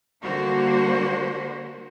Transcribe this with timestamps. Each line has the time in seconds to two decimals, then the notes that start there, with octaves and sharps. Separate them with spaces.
0.22 D3 G3 A#3 F#4 C5